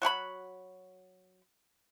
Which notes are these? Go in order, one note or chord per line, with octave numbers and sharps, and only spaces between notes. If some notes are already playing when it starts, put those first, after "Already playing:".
F#3 F#4 G#4 B5